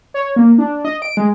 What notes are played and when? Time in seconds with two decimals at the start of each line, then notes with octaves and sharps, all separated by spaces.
0.14 C#5
0.36 A#3
0.58 D4
0.85 D#5
1.02 D7
1.17 G#3